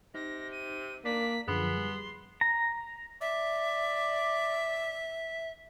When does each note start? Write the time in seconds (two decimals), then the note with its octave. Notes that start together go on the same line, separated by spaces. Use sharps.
0.14 C3 D#4 A#6
0.52 D#7
1.05 A#3 D4 B6
1.48 F#2 D3 F3 B3 G#4 C6
1.77 G3
2.41 A#5
3.21 D5 E5